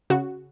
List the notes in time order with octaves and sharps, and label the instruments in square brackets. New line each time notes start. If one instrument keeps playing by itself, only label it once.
[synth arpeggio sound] C#3 F#4